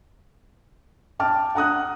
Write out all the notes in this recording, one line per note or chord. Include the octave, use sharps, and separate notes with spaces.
G5 A5 D6 F6
F#5 A#5 D#6 F#6